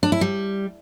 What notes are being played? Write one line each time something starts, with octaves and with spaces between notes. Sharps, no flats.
D4
E4
G3